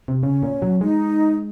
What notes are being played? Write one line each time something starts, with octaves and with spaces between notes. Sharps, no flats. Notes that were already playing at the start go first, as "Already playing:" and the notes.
C3
C#3 C#4
A#2
F#3
G#3 D#4